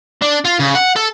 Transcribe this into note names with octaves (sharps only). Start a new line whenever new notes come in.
D4
F4
C#3
F#5
A4